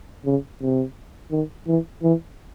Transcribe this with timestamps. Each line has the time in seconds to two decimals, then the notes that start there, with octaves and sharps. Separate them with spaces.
0.26 C#3
0.62 C3
1.31 D#3
1.67 E3
2.03 E3